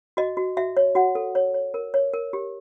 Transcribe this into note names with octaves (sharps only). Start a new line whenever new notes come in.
F#4 D#5
F#4
F#4 E5
C#5
F#4 F#5
A4
C#5
C#5
A#4
C#5
A#4
G4